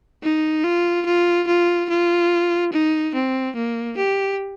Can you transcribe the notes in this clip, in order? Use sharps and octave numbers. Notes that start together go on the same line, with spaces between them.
D#4
F4
F4
F4
F4
D#4
C4
A#3
G4